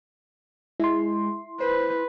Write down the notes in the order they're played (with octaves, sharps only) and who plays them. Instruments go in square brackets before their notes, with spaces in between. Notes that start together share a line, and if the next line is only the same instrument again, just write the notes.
[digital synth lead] G#3 [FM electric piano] E4 C6
[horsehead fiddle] B4 [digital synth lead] C5